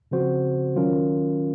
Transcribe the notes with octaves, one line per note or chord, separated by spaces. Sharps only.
C#3 F3 C4 F#4 C5
D#3 F#3 C#4 F4 A#4